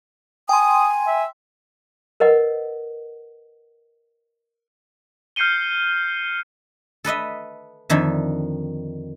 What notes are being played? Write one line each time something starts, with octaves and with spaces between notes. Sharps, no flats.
G5 G#5 C6 D#6
E5
A#4 B4 D#5 F#5
F6 G6 C7 C#7 D#7 G7
A4 B4 D#5 E5
F2 D3 D#3 E5